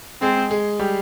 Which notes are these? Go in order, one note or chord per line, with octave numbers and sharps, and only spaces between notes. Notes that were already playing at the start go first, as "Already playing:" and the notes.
G#3 C4 G#4
G#3 G#4
G3 G4